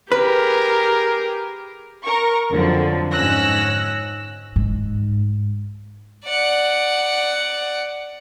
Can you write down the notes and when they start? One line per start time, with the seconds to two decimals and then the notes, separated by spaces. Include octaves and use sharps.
0.12 G4 G#4 A#4 B4
2.03 A#4 C#6
2.50 F2 D3 F3 F#3
3.12 G#2 C#4 E6 F#6 A#6
4.56 G#2
6.26 D5 F#5